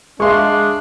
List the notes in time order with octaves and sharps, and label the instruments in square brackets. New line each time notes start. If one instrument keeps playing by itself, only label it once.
[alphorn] G#3 [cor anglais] D4 [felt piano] G#4 E5 [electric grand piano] F5 C6 C#6